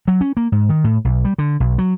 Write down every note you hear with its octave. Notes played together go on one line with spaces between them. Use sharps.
F#3
C#4
A#3
G#2
D#3
A2
B1
G3
D3
B1
F#3